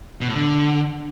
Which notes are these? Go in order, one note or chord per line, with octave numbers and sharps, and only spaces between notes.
B2
A2
D3